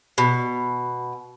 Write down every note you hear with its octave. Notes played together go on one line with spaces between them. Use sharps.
B2